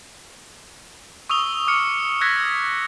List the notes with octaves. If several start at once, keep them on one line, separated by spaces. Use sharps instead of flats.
C#6 D#6 E6 F7 G7
D6 F6 C#7
E6 F#6 G#6 A#6 B6